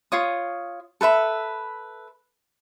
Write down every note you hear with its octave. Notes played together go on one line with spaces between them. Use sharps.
F4 C#5 D#6
A4 B4 E5 B5